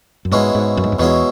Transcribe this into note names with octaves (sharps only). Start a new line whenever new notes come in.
F#2
G#2 B2 G#3 C#4 E4
G#2
F#2
G#2
F#2
E2 B2 G#3 C#4 E4